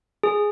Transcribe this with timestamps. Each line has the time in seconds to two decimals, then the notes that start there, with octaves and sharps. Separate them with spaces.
0.23 G#4